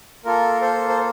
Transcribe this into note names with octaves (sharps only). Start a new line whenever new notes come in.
A#3 F4 A4 A#4
A4 C5
C5